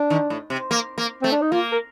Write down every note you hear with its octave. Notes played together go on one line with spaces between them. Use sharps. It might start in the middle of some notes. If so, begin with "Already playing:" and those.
Already playing: D4
D#3
A2
C3
A#3
A#3
A3 C4
D4
D#4
A#3 F4
A#4